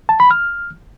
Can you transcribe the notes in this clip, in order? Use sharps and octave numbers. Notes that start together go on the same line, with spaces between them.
A5
B5
F6